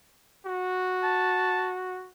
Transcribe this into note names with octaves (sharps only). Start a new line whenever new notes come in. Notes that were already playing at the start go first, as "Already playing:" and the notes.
F#4
A5